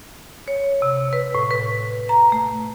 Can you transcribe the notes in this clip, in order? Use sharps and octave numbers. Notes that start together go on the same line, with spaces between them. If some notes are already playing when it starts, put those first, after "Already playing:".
C#5
C3
B4
A2
B4
A#5
A3